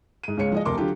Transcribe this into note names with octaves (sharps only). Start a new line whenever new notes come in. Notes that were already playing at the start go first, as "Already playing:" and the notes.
G#2 D#7
C#2 G#2 C#3 C#5 C#7
F3 G#3 D#5
F1 D2 A#4 C6 D6
D3 F#3 F4 G4